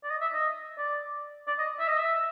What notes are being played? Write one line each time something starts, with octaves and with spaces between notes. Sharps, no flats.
D5
D#5
E5
D#5
D5
D5
D#5
E5
D#5
E5